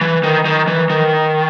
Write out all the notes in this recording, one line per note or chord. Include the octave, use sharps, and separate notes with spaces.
E3
D#3
D#3
E3
D#3